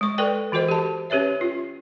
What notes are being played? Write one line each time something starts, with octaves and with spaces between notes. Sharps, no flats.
G#3 C#6
A4 B4 D5 G5
E3 F#4 A4 C5 D#5
G4 A5
C#4 G4 B4 C#5 E5
F4